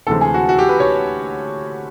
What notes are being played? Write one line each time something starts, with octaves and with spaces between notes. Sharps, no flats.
D2 C3 E3 G#3 C4 A4
G#4
F#4
F#4
G4
B4
C#5